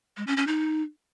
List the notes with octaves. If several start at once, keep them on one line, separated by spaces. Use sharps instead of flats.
G#3
C#4
C#4
D#4